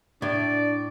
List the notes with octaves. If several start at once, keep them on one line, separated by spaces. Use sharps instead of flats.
A2 D4 D5